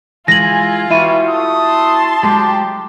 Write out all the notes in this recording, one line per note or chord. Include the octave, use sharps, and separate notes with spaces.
E3 G#3 F4 G#5 A#6 F#7
G3 E4 F#4 B4 E5 C#6 D#7
A3 A4 D#6
A5 C6
F#3 G#3 G4